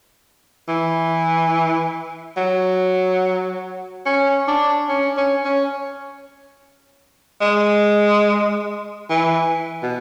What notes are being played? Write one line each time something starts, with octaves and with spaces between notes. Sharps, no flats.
E3
F#3
C#4
D4
C#4
C#4
C#4
G#3
E3
B2